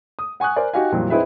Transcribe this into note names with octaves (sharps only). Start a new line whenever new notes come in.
D#6
F#5 G#5 C#6 D#6 F#6
A#4 C5 D5 G#5
D#4 F#4 G4 F5 G#5
F2 A#2 E3 F#3 G3
C4 D#4 E4 G#4 B4 E5